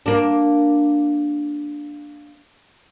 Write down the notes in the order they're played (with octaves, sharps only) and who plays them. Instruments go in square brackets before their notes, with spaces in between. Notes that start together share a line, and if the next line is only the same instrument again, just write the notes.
[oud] A#3 D4